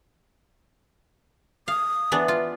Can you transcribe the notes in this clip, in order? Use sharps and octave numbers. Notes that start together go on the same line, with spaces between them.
F5 D#6
E3 B3 D4
F4